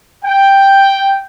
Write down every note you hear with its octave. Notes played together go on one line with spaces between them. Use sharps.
G5